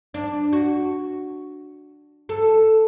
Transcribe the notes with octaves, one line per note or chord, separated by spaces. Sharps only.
D4
F#4
A4